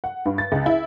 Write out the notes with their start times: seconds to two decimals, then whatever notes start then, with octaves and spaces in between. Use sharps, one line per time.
0.04 F#5
0.26 G2
0.38 A6
0.52 C#2
0.66 E4